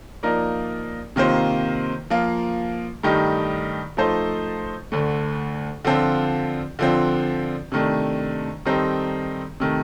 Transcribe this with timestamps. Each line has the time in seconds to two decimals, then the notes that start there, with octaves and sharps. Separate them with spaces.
0.23 F3 A#3 D#4 A#4 D5
1.16 C3 D#3 A#3 F4 C5
2.10 F3 A#3 F4
3.03 G2 D#3 A3 D#4 G4
3.97 F3 A3 D#4 A4 C5
4.92 D2 D3 A3
5.85 D3 F3 C4 F4 A4
6.79 D3 F3 C4
7.72 C3 D#3 A3 D4
8.65 D#3 G3 C4 D#4 A4
9.60 C3 D#3 A3